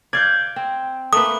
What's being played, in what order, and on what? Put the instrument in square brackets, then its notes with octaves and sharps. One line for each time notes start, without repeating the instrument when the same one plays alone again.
[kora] D5 F5 [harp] G6 G#6
[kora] C4
[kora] A3 A#3 B4 [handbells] D#6